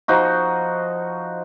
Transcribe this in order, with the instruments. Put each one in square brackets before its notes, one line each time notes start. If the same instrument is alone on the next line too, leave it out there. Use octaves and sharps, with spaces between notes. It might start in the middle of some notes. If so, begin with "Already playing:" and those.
[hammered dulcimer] F3 D#4 F#4